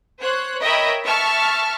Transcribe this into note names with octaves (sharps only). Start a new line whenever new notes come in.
C5 C#5 F#6
A#4 C#5 D#5 E5 G5 B5
E5 A5 C#6 F6